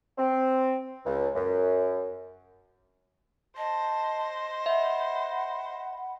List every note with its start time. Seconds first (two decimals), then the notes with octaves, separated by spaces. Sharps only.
0.18 C4
1.06 C#2
1.35 F#2
3.57 C5 D#5 A5
4.66 E5 F#5 B5